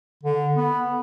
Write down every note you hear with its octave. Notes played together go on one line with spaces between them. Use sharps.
D3
B3